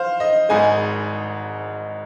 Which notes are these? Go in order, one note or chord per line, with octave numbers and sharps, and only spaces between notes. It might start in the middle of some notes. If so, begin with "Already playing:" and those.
Already playing: C5 F5
D#5
G#1 G#2 G#3 D#5 G#5